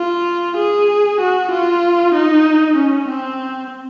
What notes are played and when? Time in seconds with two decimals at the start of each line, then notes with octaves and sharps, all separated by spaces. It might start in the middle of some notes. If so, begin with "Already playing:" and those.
Already playing: F4
0.56 G#4
1.20 F#4
1.51 F4
2.14 D#4
2.76 C#4
3.08 C4